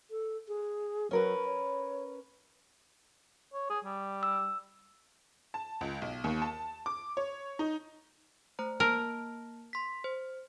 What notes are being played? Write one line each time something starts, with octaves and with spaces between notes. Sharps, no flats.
A4
G#4
F#3 C#4 A#4 B4
C#5
C#5
G#4
G3
E6
A5
C#2
B1
D#2
A5
D6
C#5
D#4
A3 C5 A#5
A#3 A#4 A5
C6 B6
C5